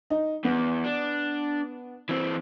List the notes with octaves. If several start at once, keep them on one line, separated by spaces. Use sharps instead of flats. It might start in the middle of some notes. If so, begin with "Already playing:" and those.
D#4
E2 B3
D4
E3 C4